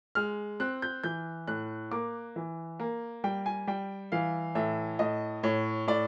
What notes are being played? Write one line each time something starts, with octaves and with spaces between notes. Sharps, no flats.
G#3 F6
C4 F#6
G6
E3 G6
A2 F#6
A#3 D6
E3
A#3
G3 G5
G#5
G3 G5
E3 F5
A2 E5
A2 D#5
A2 C#5
A2 D5